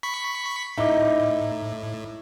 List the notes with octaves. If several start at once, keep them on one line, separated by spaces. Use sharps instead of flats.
B5 C#6 B6
A2 D#4 E4 D6